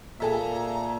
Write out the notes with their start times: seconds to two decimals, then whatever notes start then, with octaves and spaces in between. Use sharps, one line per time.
0.20 A#2 G#4 A4 E5 A#5